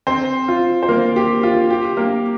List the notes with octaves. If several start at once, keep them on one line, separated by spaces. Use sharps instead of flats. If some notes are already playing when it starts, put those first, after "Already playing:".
C4 C5
F4
C5
A#3 A#4
G4
F4
G4
A#3 A#4